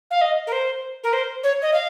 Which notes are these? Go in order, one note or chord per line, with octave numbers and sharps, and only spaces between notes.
F5
D#5
A#4
C5
A#4
C5
C#5
D#5
F5